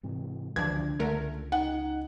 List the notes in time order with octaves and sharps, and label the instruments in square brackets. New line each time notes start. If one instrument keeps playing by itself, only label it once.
[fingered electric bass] G#2 C3 E3
[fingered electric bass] C#2 D3 [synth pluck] E3 F3 D4 [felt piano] G#6
[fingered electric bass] C#2 [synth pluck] D3 A3 A#4
[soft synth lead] D#4 [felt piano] F#5